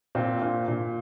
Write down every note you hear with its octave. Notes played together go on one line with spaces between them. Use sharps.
A#2 C4
A#2
A#2